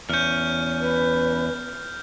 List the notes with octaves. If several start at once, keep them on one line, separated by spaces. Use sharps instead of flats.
E2 C#4 F6 G6
B4